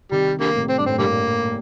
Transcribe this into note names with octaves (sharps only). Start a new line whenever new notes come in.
C3 D#3 G3
D3 G3 A#3
A2 C3
C4
G2 D4
A2 C4
G2 A#2 D3 G3 A#3